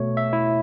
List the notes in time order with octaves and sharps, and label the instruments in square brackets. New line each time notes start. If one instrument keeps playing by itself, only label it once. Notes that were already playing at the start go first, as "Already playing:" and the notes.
Already playing: [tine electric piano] B2 A3 C#5
E5
E4